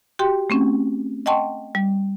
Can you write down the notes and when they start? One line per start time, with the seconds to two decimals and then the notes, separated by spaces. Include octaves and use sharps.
0.19 F#4 G4 G5 C6
0.50 A3 C4 C#4
1.26 D#5 F#5 G5 A5 C6 C#6
1.75 G3